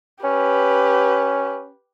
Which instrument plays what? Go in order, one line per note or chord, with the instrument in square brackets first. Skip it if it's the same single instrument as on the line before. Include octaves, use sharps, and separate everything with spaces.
[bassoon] C#4 [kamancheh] G4 B4